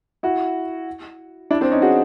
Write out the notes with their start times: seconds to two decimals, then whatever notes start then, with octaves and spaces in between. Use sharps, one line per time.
0.23 E4 F#4
1.51 D4 E4
1.61 C4 D4
1.72 C#4 D#4
1.82 F#4 G#4